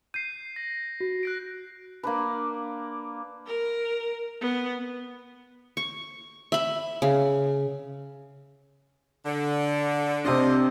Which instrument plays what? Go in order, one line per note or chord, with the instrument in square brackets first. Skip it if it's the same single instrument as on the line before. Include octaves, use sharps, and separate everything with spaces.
[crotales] G6 C7 [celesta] D#7
[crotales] A#6
[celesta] F#4
[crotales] F#6 A#6 D7
[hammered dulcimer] A#3 D4 B4
[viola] A#4
B3
[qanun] C#6
E5 B5
C#3
[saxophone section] D3
[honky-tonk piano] C3 D4 [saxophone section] F4 D#5